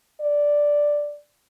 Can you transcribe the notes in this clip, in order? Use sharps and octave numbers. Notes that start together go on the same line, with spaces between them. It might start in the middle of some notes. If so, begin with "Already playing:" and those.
D5